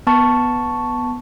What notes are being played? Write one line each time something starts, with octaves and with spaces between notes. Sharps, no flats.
B3 A5 C#6